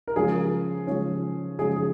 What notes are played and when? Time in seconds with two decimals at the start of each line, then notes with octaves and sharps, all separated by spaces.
0.08 A#4
0.16 C#3 F3 G#3 C#4 G#4
0.87 C#3 F3 G#3 C#4
1.59 C#3 F3 G#3 C#4 G#4
1.76 G#4